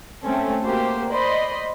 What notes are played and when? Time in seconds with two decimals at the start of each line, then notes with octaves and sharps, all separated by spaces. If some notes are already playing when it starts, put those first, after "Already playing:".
0.24 A3 C4 C#4 A4
0.66 A#3 F#4 G4 C5
1.12 C5 D5 D#5 B5 C6